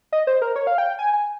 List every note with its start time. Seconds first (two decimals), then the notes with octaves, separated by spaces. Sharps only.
0.13 D#5
0.27 C5
0.42 A#4
0.56 C#5
0.67 F5
0.78 G5
0.99 G#5
1.13 G#5